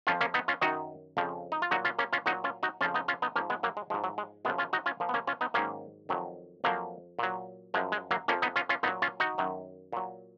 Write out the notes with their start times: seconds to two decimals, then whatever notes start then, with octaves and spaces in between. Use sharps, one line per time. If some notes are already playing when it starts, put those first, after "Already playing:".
0.07 F2 F3 C#4 F4
0.21 A#3 C#4
0.34 B3 D#4
0.48 C#4 F4
0.61 F#2 D#3 F#3 D#4 F#4
1.17 F2 C#3 F3
1.52 D#4
1.62 F4
1.71 A#2 F#3 D#4 F#4
1.85 C#4 F4
1.99 A#3 C#4
2.13 C#4 F4
2.26 A#2 F#3 D#4 F#4
2.44 C#4 F4
2.63 D#4 F#4
2.81 F2 C#3 F3 C#4 F4
2.94 B3 D#4
3.08 C#4 F4
3.22 B3 D#4
3.36 G#2 F3 A#3 C#4
3.50 G#3 B3
3.63 F#3 A#3
3.77 G#3
3.90 G#2 F3 G#3
4.04 F#3
4.18 G#3
4.45 F#2 C#3 F3 G#3 B3
4.58 C#4 F4
4.73 D#4 F#4
4.86 C#4 F4
5.00 A#2 F3
5.09 B3
5.14 A#3 C#4
5.27 C#4 F4
5.41 B3 D#4
5.54 G#2 D#3 F#3 A#3 C#4
6.09 F2 D#3 F#3
6.64 F2 F3 F#3 A#3
7.19 A#2 F#3
7.74 F#2 F3 G#3
7.92 G#3
8.11 F#3 A#3
8.28 F2 F3 A#3 C#4
8.42 B3 D#4
8.56 C#4 F4
8.69 C#4 F4
8.83 A#2 B3 D#4
8.87 F#3
9.02 C#4 F4
9.20 D#4 F#4
9.38 F#2 D#3 F#3
9.93 A#2 F#3